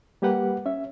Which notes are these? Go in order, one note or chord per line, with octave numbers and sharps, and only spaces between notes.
G3 A#3 G4 B4 F#5
C#4 E5